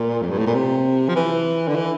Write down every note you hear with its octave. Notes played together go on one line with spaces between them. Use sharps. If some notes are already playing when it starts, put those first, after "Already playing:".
Already playing: A#2
F2
G2
A2
A#2
C3
F3
E3
D3
E3